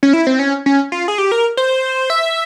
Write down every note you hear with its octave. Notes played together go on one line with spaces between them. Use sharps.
C#4
E4
C4
C#4
C#4
F4
G#4
G4
A#4
C5
E5